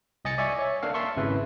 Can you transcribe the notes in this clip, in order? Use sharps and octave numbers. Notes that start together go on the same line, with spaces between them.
C2 D#5 G#5 A6 C#7
D5 E5 G#5 C#6
C#5
A#3 D4 A4 F5
E5 A5 C6 C#6
G#1 C#3 E4 B4